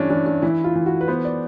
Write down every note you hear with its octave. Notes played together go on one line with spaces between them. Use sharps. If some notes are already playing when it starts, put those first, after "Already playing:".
Already playing: G2 E3 C#4 D4
E3 D4
D4
E3 E4
F4
E3
F#4
B4
B3 C5
D5